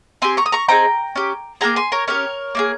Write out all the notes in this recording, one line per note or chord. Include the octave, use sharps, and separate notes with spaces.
C4 G4 G#5 C6
A#5 C#6
D#6
A#5 C#6
C4 D#4 G#4 G5 A#5
C#4 G4
A#3 F4 G#4 G5 A#5
G#5 C6
A#4 C#5
C#4 G4 A#4 C#5
A#3 F4 G#4